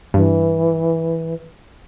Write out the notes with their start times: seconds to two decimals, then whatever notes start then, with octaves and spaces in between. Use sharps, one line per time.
0.14 G2 E3